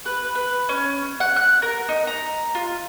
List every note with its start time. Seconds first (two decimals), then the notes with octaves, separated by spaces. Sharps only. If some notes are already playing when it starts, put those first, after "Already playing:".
0.06 B4
0.35 B4
0.69 C#4
1.20 F#5
1.36 F#6
1.62 A#4
1.89 D#4
2.07 A#5
2.55 F4